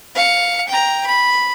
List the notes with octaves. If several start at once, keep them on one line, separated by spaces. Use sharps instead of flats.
F5 C#7
G5 A#5
B5